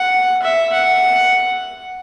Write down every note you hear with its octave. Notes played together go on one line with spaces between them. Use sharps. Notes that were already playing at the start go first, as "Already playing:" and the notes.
Already playing: F#5
E5
F#5